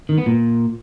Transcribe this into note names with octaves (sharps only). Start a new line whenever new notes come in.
D#3
B3
A#2